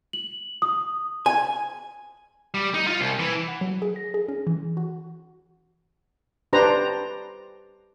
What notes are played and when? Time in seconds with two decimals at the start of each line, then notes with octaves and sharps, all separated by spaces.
0.13 F#7
0.62 D#6
1.26 G#5
2.54 G3
2.74 D#4
2.87 F4
2.99 C2
3.19 E3
3.48 F#5
3.61 F#3
3.82 G#4
3.96 A#6
4.14 G#4
4.28 C#4
4.47 E3
4.77 F#4
6.53 D4 G4 B4 C5 A#5